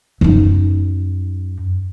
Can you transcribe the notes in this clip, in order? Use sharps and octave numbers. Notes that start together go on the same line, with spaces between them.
F#2 D#4